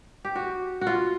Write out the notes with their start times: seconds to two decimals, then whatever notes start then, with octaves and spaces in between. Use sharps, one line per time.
0.25 G4
0.36 F#4
0.81 F#4
0.87 F4